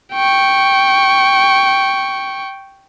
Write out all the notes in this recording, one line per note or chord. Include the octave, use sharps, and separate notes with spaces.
G5 C#6